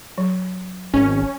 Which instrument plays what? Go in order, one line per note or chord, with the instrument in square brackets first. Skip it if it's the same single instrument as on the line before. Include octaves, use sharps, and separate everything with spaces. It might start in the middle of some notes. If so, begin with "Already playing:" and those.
[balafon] F#3
[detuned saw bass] G#1 [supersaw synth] C#4